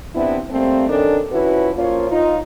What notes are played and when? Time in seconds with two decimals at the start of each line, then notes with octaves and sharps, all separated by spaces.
0.14 C3 B3 C4 D4 E4
0.50 G3 A3 A#3 C4
0.87 D#3 C#4 D4 A4
1.31 F3 C#4 E4 F#4 B4
1.76 A#2 F3 A#3 C#4 F4 C#5
2.09 D#4 F4